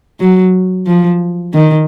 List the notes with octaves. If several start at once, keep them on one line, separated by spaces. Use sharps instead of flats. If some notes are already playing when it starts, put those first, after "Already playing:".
F#3
F3
D#3